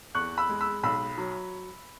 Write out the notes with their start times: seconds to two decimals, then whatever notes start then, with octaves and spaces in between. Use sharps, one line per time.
0.15 E2 C#6 F#6
0.38 B5 E6
0.49 G#3
0.61 B5 E6
0.83 B1 B5 E6
1.18 F#3